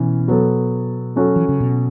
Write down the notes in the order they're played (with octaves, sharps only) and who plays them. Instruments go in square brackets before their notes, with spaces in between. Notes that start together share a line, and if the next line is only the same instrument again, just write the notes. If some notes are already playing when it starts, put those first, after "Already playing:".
Already playing: [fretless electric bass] B2 [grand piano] E3 C#4
[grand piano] F#3 B3 A4
F#3 C#4 F#4 A4
[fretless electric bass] E3
C#3
B2